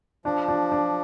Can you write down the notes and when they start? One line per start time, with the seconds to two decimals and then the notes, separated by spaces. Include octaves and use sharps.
0.25 F3 D4
0.48 D4
0.72 D4